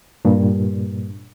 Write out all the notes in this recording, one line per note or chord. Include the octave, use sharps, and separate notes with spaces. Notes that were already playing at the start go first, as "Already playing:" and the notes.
G2 A#2